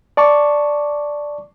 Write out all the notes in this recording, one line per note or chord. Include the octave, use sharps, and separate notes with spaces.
D5 A5 C#6 D6